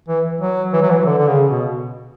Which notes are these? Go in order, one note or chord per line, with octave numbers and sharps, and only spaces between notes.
E3
F#3
E3
F#3
E3
D3
D3
C#3
B2